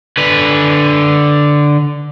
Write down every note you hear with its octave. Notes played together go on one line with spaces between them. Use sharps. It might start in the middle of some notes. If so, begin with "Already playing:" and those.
D3 B4